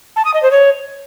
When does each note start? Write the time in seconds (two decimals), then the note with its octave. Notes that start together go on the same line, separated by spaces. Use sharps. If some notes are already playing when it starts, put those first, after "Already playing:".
0.16 A5
0.25 D#6
0.34 D#5
0.43 C5
0.51 C#5